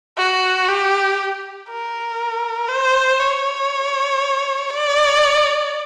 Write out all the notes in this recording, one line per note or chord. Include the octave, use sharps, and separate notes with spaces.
F#4
G4
A#4
C5
C#5
D5